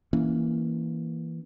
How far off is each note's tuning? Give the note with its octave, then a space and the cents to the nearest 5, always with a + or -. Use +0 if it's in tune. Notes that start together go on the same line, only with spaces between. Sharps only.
E3 -5 A#3 +0 C#4 +0